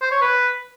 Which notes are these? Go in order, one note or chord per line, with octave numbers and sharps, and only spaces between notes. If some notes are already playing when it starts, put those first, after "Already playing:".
C5
C#5
B4